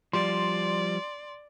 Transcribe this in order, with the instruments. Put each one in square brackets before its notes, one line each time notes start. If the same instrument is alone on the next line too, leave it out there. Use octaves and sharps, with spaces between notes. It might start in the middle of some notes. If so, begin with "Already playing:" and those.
[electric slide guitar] F3 G3 [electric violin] D5 [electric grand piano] C6